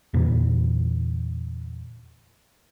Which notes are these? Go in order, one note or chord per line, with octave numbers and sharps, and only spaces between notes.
E2 A#2 D3 E3